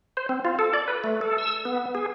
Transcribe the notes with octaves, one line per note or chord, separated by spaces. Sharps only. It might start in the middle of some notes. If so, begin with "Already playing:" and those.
C5
C4
F4
A4
D5
B4
A3
A4
E6
B3
G#4